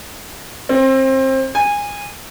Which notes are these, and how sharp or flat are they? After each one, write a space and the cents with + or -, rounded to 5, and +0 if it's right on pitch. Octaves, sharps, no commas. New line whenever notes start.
C4 +25
G#5 -20